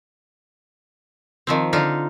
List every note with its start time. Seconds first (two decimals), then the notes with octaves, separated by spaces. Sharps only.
1.47 D#3 F3 C4
1.73 D3 D#4 F4